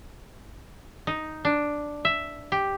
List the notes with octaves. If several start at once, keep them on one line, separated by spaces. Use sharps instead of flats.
D#4
D4
E5
G4